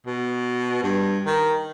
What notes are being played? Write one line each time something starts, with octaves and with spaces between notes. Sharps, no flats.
B2
G2
D#3